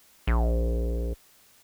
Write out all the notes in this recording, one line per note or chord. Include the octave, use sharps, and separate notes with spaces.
A#1